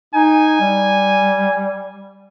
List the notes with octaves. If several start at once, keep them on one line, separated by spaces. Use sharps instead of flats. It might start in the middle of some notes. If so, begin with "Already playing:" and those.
D#4 G#5
G3